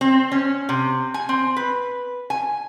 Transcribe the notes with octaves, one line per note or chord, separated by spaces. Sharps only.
C4
C#4
C3
G#5
C4
B4
G#5